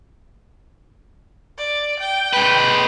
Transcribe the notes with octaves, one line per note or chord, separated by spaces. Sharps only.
D5
G5
G#3 B4